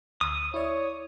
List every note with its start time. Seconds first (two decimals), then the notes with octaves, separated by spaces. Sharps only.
0.21 D2 D#6 E6
0.54 E4 C#5 D5